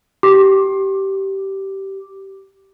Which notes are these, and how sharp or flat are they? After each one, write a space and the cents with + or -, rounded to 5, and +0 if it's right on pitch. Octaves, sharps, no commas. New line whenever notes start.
G4 -15 D6 +0